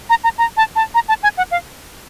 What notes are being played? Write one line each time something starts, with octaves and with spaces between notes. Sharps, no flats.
A#5
A#5
A#5
A5
A5
A#5
A5
G#5
F#5
F5